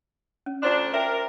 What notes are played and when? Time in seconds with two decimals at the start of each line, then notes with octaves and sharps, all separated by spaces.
0.46 C#4
0.63 D2 D4 F4 C5 C6
0.94 A#4 E5 G5